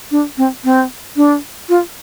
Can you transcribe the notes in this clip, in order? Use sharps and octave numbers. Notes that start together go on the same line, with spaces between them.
D4
C4
C4
D4
F4